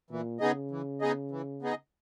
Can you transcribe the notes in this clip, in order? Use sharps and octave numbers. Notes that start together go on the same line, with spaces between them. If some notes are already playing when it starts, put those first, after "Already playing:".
A#2 E3
C#3 B3 D#4 G#4 D#5
E3
B3 D#4 G#4 D#5
E3
B3 D#4 G#4 D#5